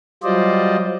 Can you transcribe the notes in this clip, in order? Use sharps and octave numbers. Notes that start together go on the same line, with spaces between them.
F#3 G3 F4 C5 D5 D#5